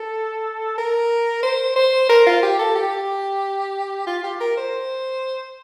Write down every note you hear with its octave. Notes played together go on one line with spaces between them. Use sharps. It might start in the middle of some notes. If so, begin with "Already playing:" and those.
Already playing: A4
A#4
C5
C5
A#4
F4
G4
A4
G4
F4
G4
A#4
C5